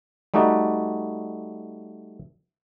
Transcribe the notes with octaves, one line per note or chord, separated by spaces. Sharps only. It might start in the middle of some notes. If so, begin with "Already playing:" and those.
G3 A3 D#4 F#4 D5